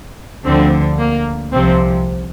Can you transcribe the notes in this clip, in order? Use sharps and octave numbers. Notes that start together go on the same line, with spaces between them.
D2 D3 F3 C4
A#3
C2 C3 F3 C4